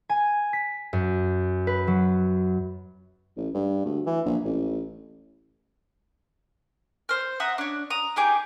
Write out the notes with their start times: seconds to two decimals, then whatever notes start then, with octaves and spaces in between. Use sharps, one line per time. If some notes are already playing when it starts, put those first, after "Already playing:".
0.09 G#5
0.53 B6
0.93 F#2
1.67 B4
1.87 F#3
3.37 A1
3.54 G2
3.86 D2
4.06 E3
4.26 A#1
4.44 A1
7.09 C5 F6
7.40 E5 F#5 A#5 D#6
7.58 D4 C#5
7.90 A#5 D#6
8.16 D#4 G4 G#4 D6